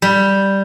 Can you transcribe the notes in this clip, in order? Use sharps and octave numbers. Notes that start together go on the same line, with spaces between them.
G3